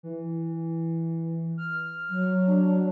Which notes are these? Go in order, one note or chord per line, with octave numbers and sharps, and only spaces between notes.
E3
F6
F#3
D4